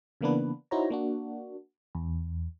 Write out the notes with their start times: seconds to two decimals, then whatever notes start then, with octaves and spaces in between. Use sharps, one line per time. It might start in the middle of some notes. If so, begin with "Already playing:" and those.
0.21 C#3 E3 A#3 B3 D4 B4
0.71 D#4 E4 F#4 C5 C#5 A#5
0.90 A#3 D4 F#4
1.95 E2